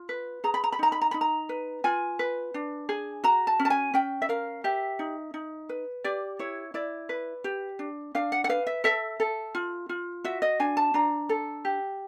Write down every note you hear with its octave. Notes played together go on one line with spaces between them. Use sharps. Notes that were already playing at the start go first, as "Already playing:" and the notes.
Already playing: F4
B4
G#4 A#5
B5
A#5
B5
D#4 A#5
B5
A#5
D#4 B5
A#5
B4
F4 G#5
B4
D4
G#4
F#4 A#5
A5
C#4
A5
G#5
C#4 G5
E5
A#4 F5
G4 E5
D#4
D#4
B4
G4 D5
E4 C#5
E4 D5
B4
G4
D4
D4 F5
F#5
F#5
B4 F5
E5
A4 E5
A4
F4
F4
F#4 E5
D#5
D4 G#5
A5
D4 A#5
A4
G4